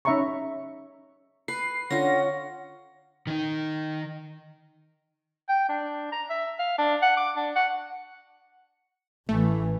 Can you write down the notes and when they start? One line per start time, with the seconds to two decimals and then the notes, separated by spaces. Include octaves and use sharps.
0.05 C#4 D#4 E5 A#5 B5 C#6
1.48 B4 C7
1.91 D3 C#4 F4 F#5 A#6
3.27 D#3 D#4
5.49 G5
5.69 D4
6.12 A#5
6.29 E5
6.59 F5
6.78 D4
7.02 F#5
7.17 D6
7.36 D4
7.56 F#5
9.29 A1 E3 A3